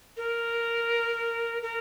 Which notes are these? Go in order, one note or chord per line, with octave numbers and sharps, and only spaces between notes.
A#4
A#4